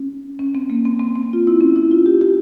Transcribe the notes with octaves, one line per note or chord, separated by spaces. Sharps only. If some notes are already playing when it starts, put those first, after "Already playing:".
Already playing: C#4
C#4
C4
A#3
C4
C4
C4
F4
E4
C#4
E4
F4
G4
G4